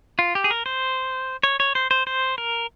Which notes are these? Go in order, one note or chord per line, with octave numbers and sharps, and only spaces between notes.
F4
G4
G#4
A#4
C5
C#5
C#5
C5
C5
C5
A#4